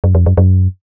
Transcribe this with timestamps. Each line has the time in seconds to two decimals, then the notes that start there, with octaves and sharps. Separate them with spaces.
0.04 F#2
0.15 F2
0.26 F#2
0.37 F#2